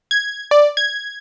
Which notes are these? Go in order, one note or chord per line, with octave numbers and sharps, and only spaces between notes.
G#6
D5
G#6